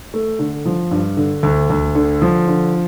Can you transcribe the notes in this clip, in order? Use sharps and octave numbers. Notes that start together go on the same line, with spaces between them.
A3
D3
F3
G2
D3
D2
D2
D3
F3
D3